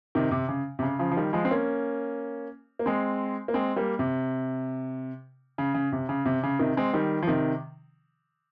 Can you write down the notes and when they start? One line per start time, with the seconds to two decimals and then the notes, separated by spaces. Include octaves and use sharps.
0.15 C3 D#3
0.31 C3
0.48 C#3
0.79 C3
0.83 C#3
0.99 C#3 F3
1.12 F3
1.17 D#3 G3
1.33 F3 G#3
1.45 C4
1.51 A#3 C#4
2.79 A#3
2.86 G#3 C4
3.48 A#3
3.54 G#3 C4
3.76 G3 A#3
3.99 C3
5.58 C#3
5.74 C#3
5.92 C3
6.09 C#3
6.25 C3
6.43 C#3
6.59 C3 D#3
6.77 G#3 C4
6.93 D#3 G3
7.23 F3
7.27 C3 D#3